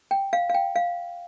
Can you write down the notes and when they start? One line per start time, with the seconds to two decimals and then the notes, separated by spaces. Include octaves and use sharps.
0.11 G5
0.33 F5
0.49 F5
0.54 G5
0.75 F5